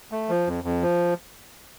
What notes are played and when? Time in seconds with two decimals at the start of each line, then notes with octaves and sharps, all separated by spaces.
0.12 A3
0.29 F3
0.47 F2
0.64 F2
0.82 F3